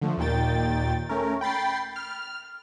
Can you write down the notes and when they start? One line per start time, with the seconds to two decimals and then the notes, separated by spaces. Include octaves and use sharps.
0.01 D3 F3 A3
0.17 D#2 A#2 D#3 G5 A6
1.09 A3 C#4 A#4
1.41 G5 B5 A6 C7
1.96 F6